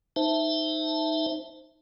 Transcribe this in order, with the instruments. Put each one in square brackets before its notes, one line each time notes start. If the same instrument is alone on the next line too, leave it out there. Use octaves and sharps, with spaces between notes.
[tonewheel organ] D#4 C5 E5 A5